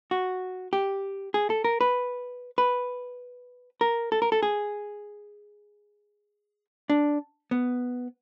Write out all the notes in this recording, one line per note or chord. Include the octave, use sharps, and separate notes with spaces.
F#4
G4
G#4
A4
A#4
B4
B4
A#4
A4
A#4
A4
G#4
D4
B3